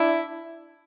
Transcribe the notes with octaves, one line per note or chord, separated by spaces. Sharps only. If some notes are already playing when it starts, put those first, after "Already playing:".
Already playing: D4 E4